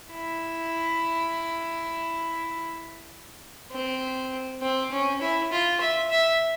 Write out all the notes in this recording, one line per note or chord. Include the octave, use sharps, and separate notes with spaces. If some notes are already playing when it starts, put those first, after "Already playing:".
E4
C4
C4
C#4
E4
F4
E5
E5